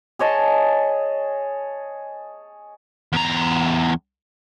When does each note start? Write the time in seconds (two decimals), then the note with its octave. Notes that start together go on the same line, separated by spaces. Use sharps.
0.19 G#4 C#5 D#5 A5
3.13 E2 A#5